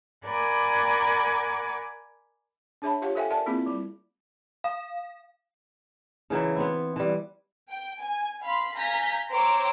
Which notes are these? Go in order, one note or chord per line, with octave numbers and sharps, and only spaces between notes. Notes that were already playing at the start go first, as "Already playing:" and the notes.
A#4 D5 F#5 G#5 B5 D6
D4 G#4 C#5 E5 A5 B5
F4 G4 C#5 F5 F#5
A4 C5 E5 F5 G5 G#5
A#4 D5 E5 F#5 G#5 A5
A#3 C4 E4 F4 G#4
G3 E4
F5
C#3 E3 F#3 E4
B3 C4 E4
E3 G3
G5
G#5
F5 B5 C6
F5 G#5 A#5 G6 A#6 B6
C5 C#5 G5 A#5 D6 E6